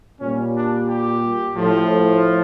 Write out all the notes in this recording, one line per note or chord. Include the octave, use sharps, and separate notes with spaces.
A#2 G3 C#4
D4
G4
A2 F3